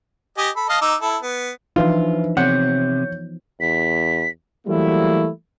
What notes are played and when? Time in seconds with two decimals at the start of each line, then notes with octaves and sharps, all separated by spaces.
0.38 G4 D#5 G#5
0.56 A4 B5
0.69 D#5 F5 A5
0.82 D#4 D6 E6
1.01 E4 A4
1.23 B3
1.76 E3 F3 D4 D#4 F4 B4 E5
2.37 C3 B3 C#5 F#5 G6
3.61 E2 B6
4.67 E3 F#3 G3 A3 A#3 E4